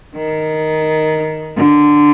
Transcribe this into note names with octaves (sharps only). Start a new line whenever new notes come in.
D#3
D3